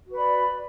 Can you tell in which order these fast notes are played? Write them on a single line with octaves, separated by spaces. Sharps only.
F#4 B4 B5 D5